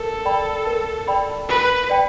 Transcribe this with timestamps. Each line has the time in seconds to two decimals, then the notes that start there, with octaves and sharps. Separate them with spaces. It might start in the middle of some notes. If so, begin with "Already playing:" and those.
Already playing: A4 A#4
0.25 D5 G5 B5
0.67 A#4
1.08 D5 G5 B5
1.49 A#4 B4
1.90 D5 G5 B5